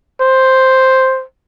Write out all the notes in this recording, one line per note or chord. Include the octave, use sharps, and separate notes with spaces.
C5